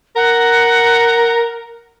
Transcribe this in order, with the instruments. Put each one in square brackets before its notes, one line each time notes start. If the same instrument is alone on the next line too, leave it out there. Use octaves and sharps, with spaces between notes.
[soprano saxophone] A#4 [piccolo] F#5